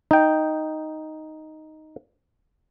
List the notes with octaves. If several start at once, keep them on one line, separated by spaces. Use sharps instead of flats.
D#4 G5